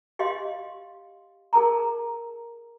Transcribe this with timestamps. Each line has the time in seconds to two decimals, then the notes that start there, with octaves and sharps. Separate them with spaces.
0.19 G4 D#5 F5 C6
1.53 G#4 A#4 A5 A#5